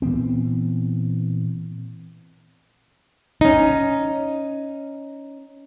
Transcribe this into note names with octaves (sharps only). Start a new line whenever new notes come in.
A#2 E3 B3 C4
C#4 D#4